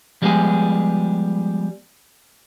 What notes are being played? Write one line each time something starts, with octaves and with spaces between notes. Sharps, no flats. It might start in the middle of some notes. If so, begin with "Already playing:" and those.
F3 G3 G#3 B3 G4 G#4